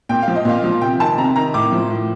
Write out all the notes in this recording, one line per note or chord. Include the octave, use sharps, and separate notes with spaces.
A#2 G5
F5
F3
D#5
A#2 F5
F3
C3 G5
D#3 A5
C3 A#5
D#3 A#5
A2 D6
F3
A2